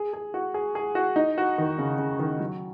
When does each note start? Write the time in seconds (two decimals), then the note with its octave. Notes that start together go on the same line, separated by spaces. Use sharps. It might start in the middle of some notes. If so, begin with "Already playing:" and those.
Already playing: G#4
0.13 G#4
0.34 F#4
0.54 G#4
0.75 G#4
0.95 F#4
1.16 D#4
1.38 F#4
1.58 D#3
1.78 C#3
1.98 C#3
2.19 D#3
2.40 F#3